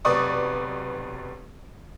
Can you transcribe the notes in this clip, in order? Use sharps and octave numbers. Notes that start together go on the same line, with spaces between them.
F1 B1 B4 D5 C#6 D#6